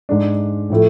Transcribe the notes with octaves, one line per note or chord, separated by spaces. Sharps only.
G#2 G#3 D4
A2 F3 A3 E4